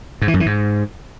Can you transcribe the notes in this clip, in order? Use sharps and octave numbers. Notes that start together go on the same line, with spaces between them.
G#2
E3
F#2
E3
G#2